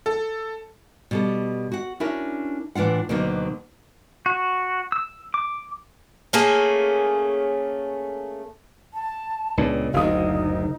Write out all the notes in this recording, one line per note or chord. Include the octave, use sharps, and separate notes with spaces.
A4
B2 G3 A4
F#4 F#5
C#4 D4 E4 F#4 A#4
A2 E3 D4 F4 F#5
D2 B2 D3 D#3 F#3 A#3
F#4
E6
D6
A3 A#3 C#4 G#4
A5
C#2 A#2 B3 D4
F#1 D2 D#4 F5 D#6